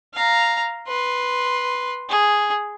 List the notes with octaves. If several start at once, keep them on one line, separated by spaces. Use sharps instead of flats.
F5 A#5
B4 C6
G#4